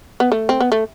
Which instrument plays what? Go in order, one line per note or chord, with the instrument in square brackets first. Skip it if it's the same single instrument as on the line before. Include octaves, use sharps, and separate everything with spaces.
[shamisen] B3
A3
C4
B3
A3